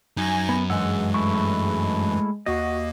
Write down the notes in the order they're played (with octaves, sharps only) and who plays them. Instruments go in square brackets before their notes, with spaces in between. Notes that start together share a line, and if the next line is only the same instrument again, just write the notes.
[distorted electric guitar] F#2 [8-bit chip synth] D#4 A#6 [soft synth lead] G#5
[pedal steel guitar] B3
[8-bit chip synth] G2 E3 [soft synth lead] G#3 [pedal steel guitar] F#5 E6
[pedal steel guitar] A3 E4 C#6
[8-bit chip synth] D#2 A#3 [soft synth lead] F#4 [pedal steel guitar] D#5